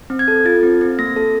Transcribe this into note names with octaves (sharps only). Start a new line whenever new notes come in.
C4
G#6
A4
F4 A6
C4
C4
A#3 A#6
A4